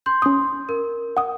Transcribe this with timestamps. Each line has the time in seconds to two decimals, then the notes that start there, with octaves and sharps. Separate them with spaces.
0.06 C6 G6
0.22 C#4 D#6
0.69 A#4
1.17 F#5 D#6